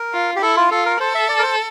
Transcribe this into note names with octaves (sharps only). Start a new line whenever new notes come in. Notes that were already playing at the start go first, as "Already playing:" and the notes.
Already playing: A#4
F4
G4
E4 A4
F4
F4 A4
A#4
A4 C5
E5
D5
A#4
C5